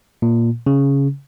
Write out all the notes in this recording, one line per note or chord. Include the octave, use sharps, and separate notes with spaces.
A#2
C#3